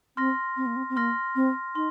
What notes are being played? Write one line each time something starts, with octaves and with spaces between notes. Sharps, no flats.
C4 C6 F6 A#6
C4
A#3
C4
C4
A#3 C6 F6 A#6
C4
D#4 C6